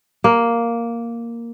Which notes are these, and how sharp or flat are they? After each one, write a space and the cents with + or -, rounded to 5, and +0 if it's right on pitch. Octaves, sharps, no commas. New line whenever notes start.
A#3 +0